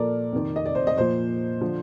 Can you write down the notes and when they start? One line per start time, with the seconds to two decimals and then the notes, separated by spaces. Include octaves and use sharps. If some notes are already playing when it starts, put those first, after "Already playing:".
Already playing: A#2 F3 A4 A#4 D5
0.32 F2 C3 D#3
0.56 D#5
0.66 D5
0.75 C5
0.87 D#5
0.97 A#2 F3 C5
1.61 D3 F3